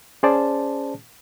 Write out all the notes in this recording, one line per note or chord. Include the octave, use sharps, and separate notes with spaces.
C#4 G#4 C5 D5 A5